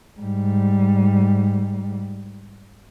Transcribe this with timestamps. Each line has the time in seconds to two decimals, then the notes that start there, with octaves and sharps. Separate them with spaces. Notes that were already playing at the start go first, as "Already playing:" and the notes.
0.21 G#2 G3